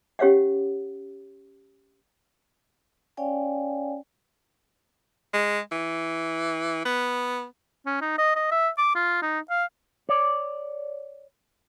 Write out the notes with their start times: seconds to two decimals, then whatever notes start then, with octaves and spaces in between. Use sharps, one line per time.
0.19 C#4 G4 C#5 F5 F#5
3.17 C#4 C#5 D5 F5 G5 G#5
5.33 G#3
5.72 E3
6.85 B3
7.86 C#4
8.01 D#4
8.18 D#5
8.36 D#5
8.51 E5
8.78 D6
8.95 F4
9.22 D#4
9.50 F5
10.09 C#5 D5